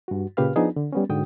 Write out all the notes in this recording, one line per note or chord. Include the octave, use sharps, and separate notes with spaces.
G2 F#4
A#2 C#3 G4 B4 F5 F6
F3 B3 D4 D#4 G#4
D3
G3 B3 C#4
G#2 D3 F#4 G5 D#6